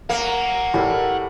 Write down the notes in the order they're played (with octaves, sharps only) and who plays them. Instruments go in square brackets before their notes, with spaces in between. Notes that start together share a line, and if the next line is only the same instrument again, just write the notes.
[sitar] A#3 [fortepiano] F5 [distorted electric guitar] F#5 A#5
[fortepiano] A2 [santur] G3 A4 A#4